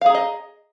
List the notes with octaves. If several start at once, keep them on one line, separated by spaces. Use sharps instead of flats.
G#4 D#5 F5 A#5